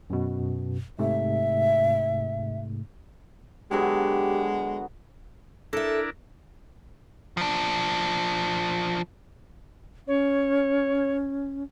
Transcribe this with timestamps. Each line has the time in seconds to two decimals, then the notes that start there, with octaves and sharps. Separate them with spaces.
0.10 F#2 B2
0.99 G#2 C3 A3 E5
3.71 D3 F#3 G#3 B3 G4
5.73 D4 E4 A4 A#4 E5
7.37 F3 D4
10.07 C#4 C#5